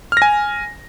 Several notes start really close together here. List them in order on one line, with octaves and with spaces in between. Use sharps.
F6 A#6 G#5